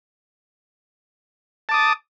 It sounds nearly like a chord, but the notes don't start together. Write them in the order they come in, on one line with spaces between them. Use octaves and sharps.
A5 D6 D#6